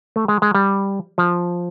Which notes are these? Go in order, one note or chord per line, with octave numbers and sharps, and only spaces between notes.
A3
G#3
G#3
G3
F3